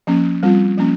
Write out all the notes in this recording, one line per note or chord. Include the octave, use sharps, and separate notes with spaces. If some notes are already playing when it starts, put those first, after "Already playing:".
F3 A#3 C#4
G3 C4 F4
F3 A#3 C#4